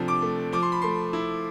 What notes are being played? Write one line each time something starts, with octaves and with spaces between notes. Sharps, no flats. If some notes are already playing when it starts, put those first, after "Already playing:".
Already playing: C3 F3 A3 D4
D6
A3
F3 D6
C6
B5
A3 C6
E4